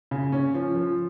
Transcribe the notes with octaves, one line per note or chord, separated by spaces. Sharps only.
C#3
C#4
F3
F3